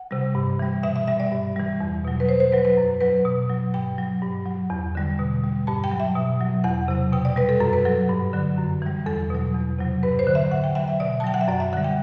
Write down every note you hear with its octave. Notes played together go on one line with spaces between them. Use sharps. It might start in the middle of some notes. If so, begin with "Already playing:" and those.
Already playing: F#5
C3 G3
G2
E3 G3
B2 E5
E5
G3 E5
D5
G2
E3 G3
E2
B2 F#3
B4
B2 C5
C5
F#3 B4
B4
F#2
F#3 B4
B2
F#3
G2 G5
F#3
G2
F#3
E2
D3 G3
B2
G3
G2 A5
G5
F#3
E5
B2
F#3
E2 F#5
C3 F#3
B2 G5
D5
G3 B4
A4
F#2 A4
B4
F#3 A4
G2
D3 F#3
F#2
E3 G3
E2 A4
B2 F#3
E2
C3 F#3
G2 B4
C5
D3 F#3
E5
A2 F#5
G5
F#3 E5
E5
B2 D5
A5
F#3 G5
F#5
E5
F#2 D5
E5
D3 G3 F#5
G5